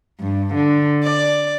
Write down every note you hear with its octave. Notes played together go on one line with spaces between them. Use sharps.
G2
D3
D5